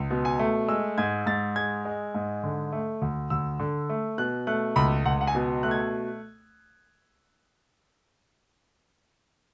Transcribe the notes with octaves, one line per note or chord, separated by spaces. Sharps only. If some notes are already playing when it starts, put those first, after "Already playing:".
Already playing: C#2
B2
G#5
A3
G#3 E6
G#2 G#6
G#2 A6
G#3 G#6
G#3
G#2
D3
A3
D2
D2 E6
D3
A3
B2 F#6
A3 F#6
C#2 B5
C#2 F#5
F#5
G#5
B2
A3 F#6
G#6